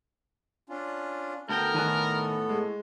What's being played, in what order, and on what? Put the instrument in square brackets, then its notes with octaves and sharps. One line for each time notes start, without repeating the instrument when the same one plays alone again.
[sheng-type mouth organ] C#4 D4 F4
[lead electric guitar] D2 G5 [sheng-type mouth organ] B3 A4 [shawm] A#4 [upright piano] A5
[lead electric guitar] A2 [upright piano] D#3 G#5 F#6
[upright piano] G#3